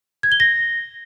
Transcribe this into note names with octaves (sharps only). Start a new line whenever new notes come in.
G#6
G7
A#6